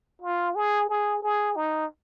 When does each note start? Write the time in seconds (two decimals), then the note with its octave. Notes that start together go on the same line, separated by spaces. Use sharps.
0.22 F4
0.55 G#4
0.89 G#4
1.23 G#4
1.56 D#4